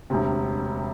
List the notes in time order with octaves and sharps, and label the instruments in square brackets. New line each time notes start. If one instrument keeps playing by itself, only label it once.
[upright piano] E1 D2 C3